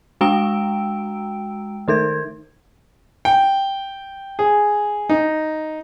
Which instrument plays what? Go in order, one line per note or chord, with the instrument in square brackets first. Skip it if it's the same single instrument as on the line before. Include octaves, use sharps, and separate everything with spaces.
[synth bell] G#3 F#4 G5 A#5 E6 D7
D#3 D#4 A#4 G#6
[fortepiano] G5
G#4
D#4